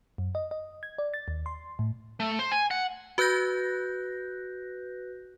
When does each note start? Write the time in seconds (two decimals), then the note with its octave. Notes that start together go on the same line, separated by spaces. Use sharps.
0.18 F#2
0.35 D#5
0.51 D#5
0.83 G#6
0.98 D5
1.14 A6
1.28 D#2
1.46 C6
1.79 A2
2.20 A3
2.39 C5
2.51 G#5
2.71 F#5
3.18 F#4 B4 F#6 G6 A#6